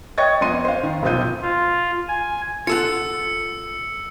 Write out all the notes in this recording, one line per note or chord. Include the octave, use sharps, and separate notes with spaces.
C#5 D#5 G5 C#6 G#6 A6
F2 B3 D#5 C6 D#7
C5 F5
D#3
F1 B1 C4 F4 G6 D#7
F4
G#5
F4 A4 F#5 E6 C#7